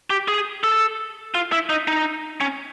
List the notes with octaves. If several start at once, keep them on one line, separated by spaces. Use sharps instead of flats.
G4
G#4
A4
F4
E4
D#4
D#4
C#4